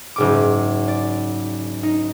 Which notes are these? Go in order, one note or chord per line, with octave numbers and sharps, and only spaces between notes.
F#1 G#2 D6
D5
D#4